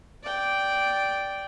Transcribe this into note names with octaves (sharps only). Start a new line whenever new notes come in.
D5 G5